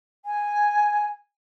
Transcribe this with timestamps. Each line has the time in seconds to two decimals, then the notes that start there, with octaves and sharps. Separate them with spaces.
0.25 G#5